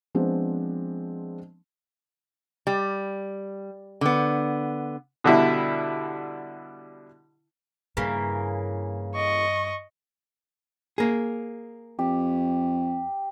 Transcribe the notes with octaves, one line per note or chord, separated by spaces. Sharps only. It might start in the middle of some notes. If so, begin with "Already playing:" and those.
F3 G#3 B3 C4 D4
G3
D3 B3
B2 D3 G3 E4
G2 C#3 E3 A#3
D#5 C#6
A#3 G#4
F2 G4